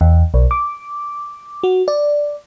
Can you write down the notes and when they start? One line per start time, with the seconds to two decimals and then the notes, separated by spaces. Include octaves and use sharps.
0.01 E2
0.34 B1
0.51 D6
1.63 F#4
1.88 D5